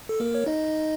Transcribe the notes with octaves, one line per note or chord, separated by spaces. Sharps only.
A4
A#3 A#4
C#5
D#4 D#5